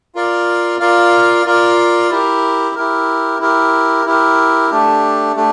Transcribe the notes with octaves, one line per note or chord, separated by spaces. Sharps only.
F4 A#4 D5 F5
F4 A#4 D5 F5
F4 A#4 D5 F5
E4 G4 A#4
E4 G4 A#4
E4 G4 A#4
E4 G4 A#4
A3 D4 G4
A3 D4 G4